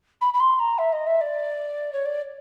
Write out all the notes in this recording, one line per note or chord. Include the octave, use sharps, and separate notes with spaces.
B5
B5
C6
A#5
E5
D#5
E5
D5
C#5
D5